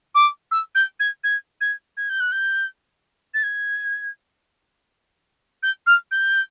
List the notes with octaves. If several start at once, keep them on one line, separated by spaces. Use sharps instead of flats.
D6
E6
G6
G#6
G#6
G#6
G#6
G6
F#6
G6
A6
G#6
G6
F6
G6